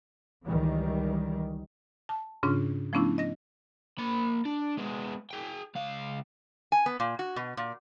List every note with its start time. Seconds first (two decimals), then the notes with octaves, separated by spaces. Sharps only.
0.44 C#2 D#3 E3 G3
2.09 A5
2.43 G#2 C#3 C#4 D4 F4
2.93 F3 A3 B3 C#4 D4 E4
3.18 D#5 A#6
3.99 A#3 B5
4.46 D4
4.78 G#3 B3
5.31 G#4 G5
5.76 C#2 F5
6.72 G#5
6.86 B3
7.00 A#2
7.19 F#4
7.36 B2
7.57 A#2